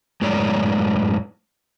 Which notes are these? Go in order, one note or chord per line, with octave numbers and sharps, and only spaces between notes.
F#2 A2 G#3 C#5 D5